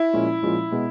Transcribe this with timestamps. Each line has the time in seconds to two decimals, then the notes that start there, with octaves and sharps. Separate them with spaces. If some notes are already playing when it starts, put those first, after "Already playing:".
Already playing: E4
0.13 A#2 F3 G#3 C#4
0.43 A#2 F3 G#3 C#4
0.72 B2 G#3 B3